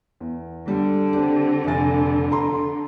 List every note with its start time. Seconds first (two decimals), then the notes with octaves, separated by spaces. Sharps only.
0.21 E2
0.68 D3 G3
1.13 C4 D4 G4
1.67 F1 G#5 A6
2.31 A4 A#5 C6